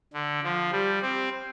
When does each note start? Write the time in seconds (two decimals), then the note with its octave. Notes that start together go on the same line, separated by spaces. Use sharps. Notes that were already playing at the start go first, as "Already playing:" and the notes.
0.13 D3
0.43 F3
0.72 G3
1.02 C4